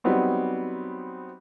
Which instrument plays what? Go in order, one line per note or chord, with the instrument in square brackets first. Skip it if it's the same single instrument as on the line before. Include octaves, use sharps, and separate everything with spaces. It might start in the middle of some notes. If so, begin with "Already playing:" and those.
[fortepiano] F#3 G3 B3 C4 D#4